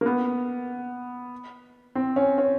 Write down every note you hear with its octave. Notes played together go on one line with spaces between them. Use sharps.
A#3
B3
C4
C#4
C#4